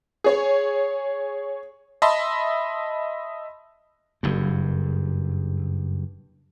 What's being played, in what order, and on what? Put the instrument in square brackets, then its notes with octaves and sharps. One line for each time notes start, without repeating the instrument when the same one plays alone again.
[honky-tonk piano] G#4 C#5
[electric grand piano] D#5 E5 A5 B5 C6
[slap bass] F#1 G2